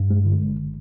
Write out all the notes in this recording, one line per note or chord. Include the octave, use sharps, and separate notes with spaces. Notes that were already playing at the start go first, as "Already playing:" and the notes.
Already playing: G2
G#3
D3
G1